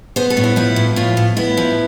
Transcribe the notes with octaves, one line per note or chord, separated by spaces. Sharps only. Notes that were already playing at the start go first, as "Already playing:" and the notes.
B3 C5
A4
A2
E4
F3 E4
A2
A2 F4
A2
B3 E4
F3